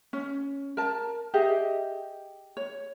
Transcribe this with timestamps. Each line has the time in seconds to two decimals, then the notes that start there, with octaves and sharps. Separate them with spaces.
0.13 C#4
0.77 A#4 A5
1.34 G4 G#4 D#5 E5
2.57 C#5